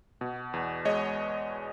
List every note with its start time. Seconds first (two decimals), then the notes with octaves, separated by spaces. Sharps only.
0.21 B2
0.54 E2
0.85 G#3 C#5 D#5